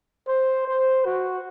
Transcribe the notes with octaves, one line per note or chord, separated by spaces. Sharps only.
C5
C5
F#4